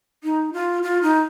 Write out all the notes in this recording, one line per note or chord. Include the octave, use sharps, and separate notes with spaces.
D#4
F4
F4
D#4